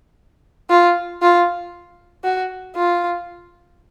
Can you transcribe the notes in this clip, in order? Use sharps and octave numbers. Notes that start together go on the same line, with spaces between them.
F4
F4
F#4
F4